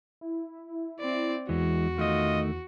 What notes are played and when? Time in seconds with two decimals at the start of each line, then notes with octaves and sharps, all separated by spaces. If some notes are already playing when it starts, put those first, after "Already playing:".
0.21 E4
1.00 C4 D5
1.49 E2 E3 G#3 F#4
1.98 D#3 A3 F4 D#5